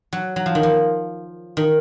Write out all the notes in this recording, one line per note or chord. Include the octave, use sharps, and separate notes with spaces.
F#3
F#3
F3
D#3
F3
D#3